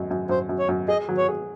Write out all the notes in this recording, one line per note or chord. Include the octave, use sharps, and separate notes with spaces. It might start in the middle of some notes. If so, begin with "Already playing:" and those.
Already playing: F#2 G#3
F#2
F#2 C5
F#2
C#5
F#2
G#4 D#5
F#3
C#5
G#4